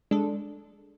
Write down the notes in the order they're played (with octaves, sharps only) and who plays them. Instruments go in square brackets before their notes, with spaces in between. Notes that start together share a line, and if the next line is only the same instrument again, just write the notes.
[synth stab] G#3 D4 A4